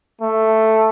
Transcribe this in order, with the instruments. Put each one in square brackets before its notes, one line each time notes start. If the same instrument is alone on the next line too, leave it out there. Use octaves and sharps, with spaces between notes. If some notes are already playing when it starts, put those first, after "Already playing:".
[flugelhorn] A3